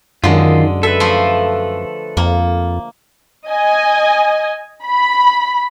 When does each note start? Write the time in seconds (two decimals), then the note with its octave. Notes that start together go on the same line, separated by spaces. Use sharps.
0.24 F#2 D3 D#3 G#3 F4
0.83 A4 B4 E5
1.00 F3 A3 F4
2.17 F2 A#3
3.48 D#5 G#5
4.85 B5